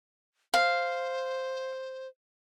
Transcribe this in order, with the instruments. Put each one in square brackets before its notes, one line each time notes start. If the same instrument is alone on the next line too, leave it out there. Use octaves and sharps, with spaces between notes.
[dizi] C5 [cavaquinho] F5